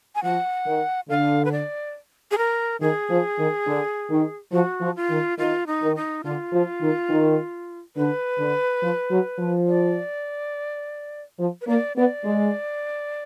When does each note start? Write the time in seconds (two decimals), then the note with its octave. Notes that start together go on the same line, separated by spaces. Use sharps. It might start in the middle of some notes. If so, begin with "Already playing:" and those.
0.15 G#5
0.23 F3 F#5
0.66 D#3
1.09 D3 F5
1.45 B4
1.52 D5
2.31 G#4
2.38 A#4
2.81 D#3 G#4
3.10 F3
3.38 D#3
3.67 D3
4.10 D#3
4.53 F3 F#4
4.81 F3
4.96 F4
5.10 D#3
5.38 D#3 F4
5.67 D#4
5.81 D#3
5.96 D#4
6.24 D3 F4
6.53 F3
6.81 D#3
7.10 D#3
7.96 D3 B4
8.39 D3
8.82 F3
9.11 F#3
9.39 F3
9.67 D5
11.39 F3
11.61 B4
11.68 A#3 D5
11.96 B3 D5
12.24 G#3